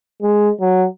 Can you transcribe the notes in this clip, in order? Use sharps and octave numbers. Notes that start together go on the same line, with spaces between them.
G#3
F#3